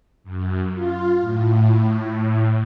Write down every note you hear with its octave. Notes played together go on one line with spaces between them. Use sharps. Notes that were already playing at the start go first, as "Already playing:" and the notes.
F#2
F4
A2